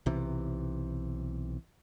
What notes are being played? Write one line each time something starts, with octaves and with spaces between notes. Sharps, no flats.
B1 C3 E3